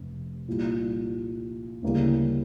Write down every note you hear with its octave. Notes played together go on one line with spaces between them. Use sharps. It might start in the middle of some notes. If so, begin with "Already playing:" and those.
Already playing: F1 C3
C2 A#2 G3
D2 C#3 E3 G3 A#3